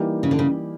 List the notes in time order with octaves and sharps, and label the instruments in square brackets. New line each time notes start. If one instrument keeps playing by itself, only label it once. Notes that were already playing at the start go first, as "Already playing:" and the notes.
Already playing: [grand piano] E3 G3 A#3 D#4 G4
[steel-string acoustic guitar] C#3
D3
C#3